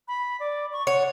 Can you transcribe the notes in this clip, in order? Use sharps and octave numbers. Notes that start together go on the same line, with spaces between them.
B5
D5
C#6
C#5 F#5